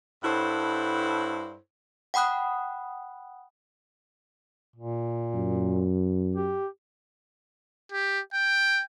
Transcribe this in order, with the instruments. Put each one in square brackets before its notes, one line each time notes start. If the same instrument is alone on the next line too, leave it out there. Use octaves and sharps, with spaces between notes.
[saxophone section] G2 E4 A4 C5 C#5 F#5
[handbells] F#5 G5 B5 D#6 F#6
[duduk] A#2
[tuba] F#2
[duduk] G4
[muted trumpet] G4
G5